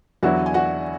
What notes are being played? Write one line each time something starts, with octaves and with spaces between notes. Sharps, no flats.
E2 D3 F#3 B3 E4 F#4 F#5
G#5
F#4 F#5